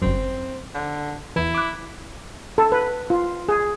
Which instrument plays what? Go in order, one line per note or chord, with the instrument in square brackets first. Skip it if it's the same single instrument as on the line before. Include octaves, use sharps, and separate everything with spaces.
[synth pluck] G1 F#2 [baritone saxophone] C4
[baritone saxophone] D3
[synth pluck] E2 E3 [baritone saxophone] E4
[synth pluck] D6 F#6
[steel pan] A4
B4
F4
G#4